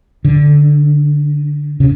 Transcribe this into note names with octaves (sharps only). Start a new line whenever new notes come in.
D3
C#3